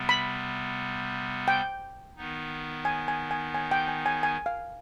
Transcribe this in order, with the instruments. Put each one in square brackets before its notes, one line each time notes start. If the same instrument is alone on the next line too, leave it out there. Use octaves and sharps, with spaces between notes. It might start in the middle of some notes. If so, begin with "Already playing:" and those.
Already playing: [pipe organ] C3 G3 B3
[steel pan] B5
G5
[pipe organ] D#3 B3 D#4
[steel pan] G#5
G#5
G#5
G#5
G5
G#5
G#5
G#5
F5